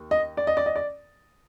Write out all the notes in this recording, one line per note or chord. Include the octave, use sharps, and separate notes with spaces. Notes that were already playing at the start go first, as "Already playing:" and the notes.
Already playing: D#2
D#5
D5
D#5
D5
D#5
D5